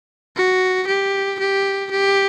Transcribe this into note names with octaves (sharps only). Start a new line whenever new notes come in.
F#4
G4
G4
G4